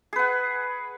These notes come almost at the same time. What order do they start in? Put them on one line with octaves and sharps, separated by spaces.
G#4 B4 F#5